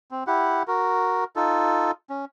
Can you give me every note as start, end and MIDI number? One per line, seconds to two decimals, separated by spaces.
0.11 0.24 60
0.27 0.63 64
0.27 0.63 67
0.27 0.63 78
0.68 1.24 66
0.68 1.24 70
1.36 1.91 63
1.36 1.91 65
1.36 1.91 69
2.10 2.25 61